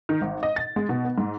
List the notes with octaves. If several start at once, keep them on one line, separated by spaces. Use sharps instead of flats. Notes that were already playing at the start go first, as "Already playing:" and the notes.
D#3
G#1
D#5
A6
G#3
B2
B3
G#2